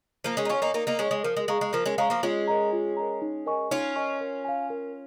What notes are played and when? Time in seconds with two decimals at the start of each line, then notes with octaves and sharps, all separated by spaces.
0.24 F3 A#3 A#4
0.37 G#3 C#4
0.45 D#4
0.49 C#4 F4 C#5 G#5 C#6
0.62 A#3 D#4
0.74 A#3 D#4 A#4
0.87 A#3 D#4
0.99 G#3 C#4 C#5 G#5 C#6
1.11 G#3
1.24 F3 A#4
1.37 G#3
1.48 G#3 F5 A#5 C#6
1.61 G#3
1.73 F3 A#3 A#4
1.86 G#3 C#4
1.98 G#3 C#4 F5 A#5 C#6
2.10 F3 A#3
2.23 G#3 C#4 F4
2.48 A#4 D#5 A#5
2.72 F4
2.97 A#4 D#5 A#5
3.22 D#4
3.46 A#4 D#5 G#5 C#6
3.71 C#4 D#4 F4
3.96 A#4 D#5 G#5 C#6
4.21 A#4
4.45 F5 G#5
4.70 A#4